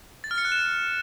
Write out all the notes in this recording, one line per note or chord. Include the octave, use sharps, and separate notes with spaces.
A6
F6
C#7
F#6
E7